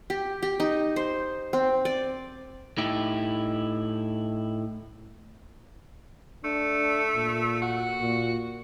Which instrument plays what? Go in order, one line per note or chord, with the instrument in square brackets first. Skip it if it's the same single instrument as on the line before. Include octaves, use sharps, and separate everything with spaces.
[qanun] G4
G4
D#4
C5
C4
D5
[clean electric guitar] A2 D#4 E4 G4
[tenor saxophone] A3 [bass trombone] D4
[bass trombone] A#2
[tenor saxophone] F#4
[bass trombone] A#2